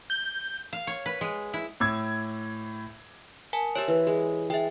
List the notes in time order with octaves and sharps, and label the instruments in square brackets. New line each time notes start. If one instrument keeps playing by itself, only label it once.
[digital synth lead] G6
[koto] F5
C#5
B4
G#3
E4
[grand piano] A2 D6 E6 G#6
[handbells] A#4 G#5 A5
[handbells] G4 C#5 [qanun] C5 E5
[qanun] E3
G#3
[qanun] G#3 [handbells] E5 G5